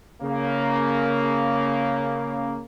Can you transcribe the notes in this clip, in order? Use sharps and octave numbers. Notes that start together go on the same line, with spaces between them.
C#3 A#3